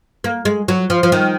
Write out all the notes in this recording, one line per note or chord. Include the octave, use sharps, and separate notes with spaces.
A#3
G#3
F#3
F3
F3
D#3